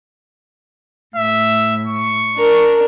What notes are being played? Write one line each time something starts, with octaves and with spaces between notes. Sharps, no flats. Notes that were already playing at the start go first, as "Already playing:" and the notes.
A2 E5
C#6
D4 A#4